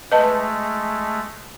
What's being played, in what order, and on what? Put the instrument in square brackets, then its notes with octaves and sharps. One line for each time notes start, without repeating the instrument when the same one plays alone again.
[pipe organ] G#3 A3 [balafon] B4 D#5 A5